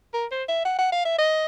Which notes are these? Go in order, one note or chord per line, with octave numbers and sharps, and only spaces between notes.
A#4
C5
E5
F#5
F#5
F5
E5
D#5